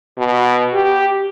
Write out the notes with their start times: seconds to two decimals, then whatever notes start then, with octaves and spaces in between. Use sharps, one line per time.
0.18 B2
0.74 G4